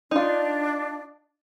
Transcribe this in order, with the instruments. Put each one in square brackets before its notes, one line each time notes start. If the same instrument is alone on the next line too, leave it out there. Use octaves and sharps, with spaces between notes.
[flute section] D4 [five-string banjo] D#4 F4